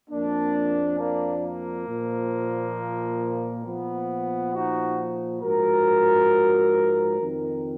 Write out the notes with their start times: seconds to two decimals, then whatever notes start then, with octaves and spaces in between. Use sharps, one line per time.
0.10 F2 F3 A#3 D4
0.99 A#3 D4
1.43 A#3
1.88 A#2 F3
3.64 A#2 F3 B3
4.53 D#4 F#4
5.42 G#2 F3 F#4 A#4
7.20 F2 D#3